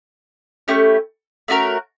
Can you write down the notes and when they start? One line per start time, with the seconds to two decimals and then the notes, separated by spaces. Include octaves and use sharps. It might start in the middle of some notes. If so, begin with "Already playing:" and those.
0.68 A3 C#4 E4 G4
1.48 A3 C#4 F#4 A#4